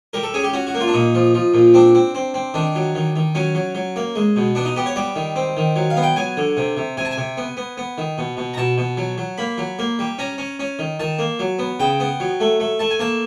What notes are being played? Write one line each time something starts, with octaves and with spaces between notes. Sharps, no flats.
G3 A#4
A4
C#4 G#4
G4
C#4 F#4
F#4
A#3
F4
D4
A#2 D#4
F3
F3
A#2
C4 D4
C4
C4
C4
D#3 D4
F#3
D#3
D#3
F#3 C#4
F#3
F#3
A#3
G#3
B2
B3 D4
D#4
B3 G4
C#5
G3 D5
D#3
C4
D#3
F#3
F5
B3
G5
F#3 G#5
D3
C3
C3
C3 G#5
A5
G#5
C3
B3
B3
B3
D#3
B2
B2
A#5
B2 A5
B2
F#3
F#3
A#3 B5
F#3
A#3
G3
C#4 A#5
C#4
C#4
D#3
D#3 A5
A#3
F#3
B3
C#3 G5
B3
F#3
A3
A3
A3 A5
G#5
A#3 A5